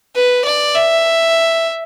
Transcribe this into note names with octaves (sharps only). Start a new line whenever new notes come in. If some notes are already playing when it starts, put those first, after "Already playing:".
B4
D5
E5